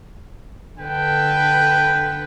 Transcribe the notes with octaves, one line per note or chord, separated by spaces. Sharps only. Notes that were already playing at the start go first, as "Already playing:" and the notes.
D3 A4 B4 G5